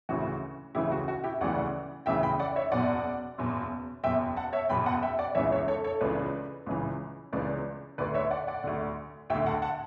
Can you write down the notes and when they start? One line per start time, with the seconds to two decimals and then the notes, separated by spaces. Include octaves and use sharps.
0.09 D2 C#3 E3 F#4
0.75 D2 C#3 E3 E4 G4
0.91 F#4
1.08 F#4
1.24 E4 G4
1.41 D2 C#3 E3 D5 F#5
2.06 D2 C#3 E3 E5 G5
2.23 G5 B5
2.39 D5 F#5
2.56 C#5 E5
2.72 F#1 E2 B2 D5 F#5
3.38 F#1 E2 B2
4.03 F#1 E2 B2 E5 G5
4.37 F#5 A5
4.53 C#5 E5
4.69 F#1 E2 B2 G5 B5
4.86 F#5 A5
5.02 E5 G5
5.19 D5 F#5
5.35 C#2 C#3 E3 C#5 E5
5.52 C#5 E5
5.68 A4 C#5
5.84 A4 C#5
6.01 C#2 C#3 E3 B4 D5
6.67 C#2 C#3 E3
7.32 C#2 C#3 E3 B4 D5
7.98 D2 D3 B4 D5
8.14 C#5 E5
8.31 D5 F#5
8.47 D5 F#5
8.64 D2 D3
9.30 D2 E5 G5
9.35 D3
9.46 F#5 A5
9.62 F#5 A5